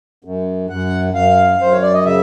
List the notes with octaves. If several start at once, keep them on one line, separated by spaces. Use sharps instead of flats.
F#2
F#2 F#5
F#2 F5
F#2 C5
C#5
D5
D#5
C#3 E5